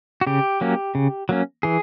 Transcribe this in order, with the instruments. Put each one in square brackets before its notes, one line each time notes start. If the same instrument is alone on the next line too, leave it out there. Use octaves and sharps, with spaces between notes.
[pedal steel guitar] F#4
C#3 G4
F#3 A#3 C#4
C#3
F#3 A#3 C#4
E3 G#4